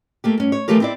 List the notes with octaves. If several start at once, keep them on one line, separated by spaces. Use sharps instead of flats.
A3 A#3 G4
G2 C#4
C#5
E3 F3 A3 F4 G4 A#4
C4 E4 D5